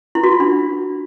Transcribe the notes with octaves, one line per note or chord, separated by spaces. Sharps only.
E4
F#4
F4
D4